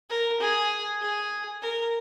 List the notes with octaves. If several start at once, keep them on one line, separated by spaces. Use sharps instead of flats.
A#4
G#4
G#4
A#4